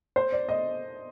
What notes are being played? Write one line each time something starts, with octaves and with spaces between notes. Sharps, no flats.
C5
D5
D#5